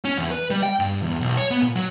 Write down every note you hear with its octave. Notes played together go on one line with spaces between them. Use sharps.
C#4
E2
B4
G3
G5
G2
E2
B1
C#5
B3
A#2
F#3